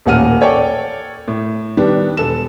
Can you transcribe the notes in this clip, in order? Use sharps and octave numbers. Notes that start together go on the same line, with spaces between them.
D#1 A1 A#3 F#5 F6 D#7
A4 C#5 D5 G5
A2
D#3 G3 B3 D4
E1 A4 E7